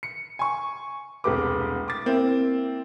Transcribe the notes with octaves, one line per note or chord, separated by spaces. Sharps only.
C#7
G#5 C#6
E1 C2 A3 G4 B4 D6
D6 A6
A#3 C4 E4